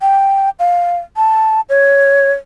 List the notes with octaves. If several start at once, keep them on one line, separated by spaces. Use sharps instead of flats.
G5
F5
A5
C#5